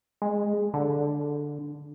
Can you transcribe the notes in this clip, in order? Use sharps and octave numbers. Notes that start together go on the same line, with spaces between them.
G#3
D3